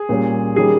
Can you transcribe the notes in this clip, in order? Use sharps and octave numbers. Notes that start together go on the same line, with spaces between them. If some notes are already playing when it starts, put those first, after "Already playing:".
Already playing: G#4
A#2 G3 C#4
D#3 G3 C#4 G#4